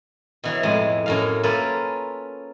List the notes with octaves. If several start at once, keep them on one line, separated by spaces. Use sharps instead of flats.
B2 E3 F#3
F2 A2 E3 G#3
F#2 A2 F5
A#3 C#4 F4 A4 B4